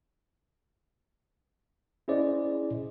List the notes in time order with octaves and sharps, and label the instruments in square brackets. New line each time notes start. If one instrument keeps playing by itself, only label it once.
[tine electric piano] C#4 E4 G#4 C5 D5 D#5